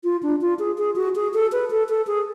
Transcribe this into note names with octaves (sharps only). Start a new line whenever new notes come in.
F4
D4
F4
G#4
G#4
F#4
G#4
A4
B4
A4
A4
G#4